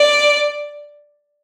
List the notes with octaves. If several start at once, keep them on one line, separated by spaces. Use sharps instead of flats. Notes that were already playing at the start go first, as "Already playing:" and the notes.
Already playing: D5